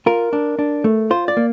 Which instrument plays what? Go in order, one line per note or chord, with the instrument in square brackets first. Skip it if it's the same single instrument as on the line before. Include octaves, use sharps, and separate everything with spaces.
[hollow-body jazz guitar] F4 A#4
D4
D4
A3
F4 C5
D5
A#3